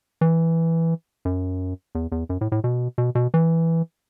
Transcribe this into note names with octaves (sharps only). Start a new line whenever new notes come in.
E3
F#2
E2
E2
F#2
A2
A2
B2
B2
B2
E3